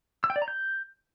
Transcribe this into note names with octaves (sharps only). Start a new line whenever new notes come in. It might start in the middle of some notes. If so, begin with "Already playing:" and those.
E6
G5
D5
A#5
G6